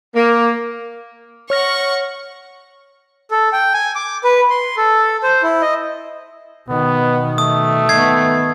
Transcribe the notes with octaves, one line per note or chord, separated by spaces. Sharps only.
A#3
C#5 F#5 C#6 F6 A#6
A4
G5
G#5
D6
B4
C6
A4
C5
E4
D#5
B2 D#3 B3
A3 D#6
D#3 B3 G#6 C7